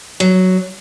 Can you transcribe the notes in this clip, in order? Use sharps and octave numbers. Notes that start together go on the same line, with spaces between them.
F#3